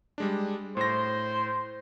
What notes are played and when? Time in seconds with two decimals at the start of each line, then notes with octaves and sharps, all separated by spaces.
0.18 G3 G#3 D4
0.77 A2 C5 A#6